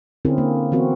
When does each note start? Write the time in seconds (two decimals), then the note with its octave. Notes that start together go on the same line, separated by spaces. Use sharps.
0.25 D3 C4 C#4 E4 G#4 A#4
0.38 A#3
0.72 E3 B3 C4 F#4 A#4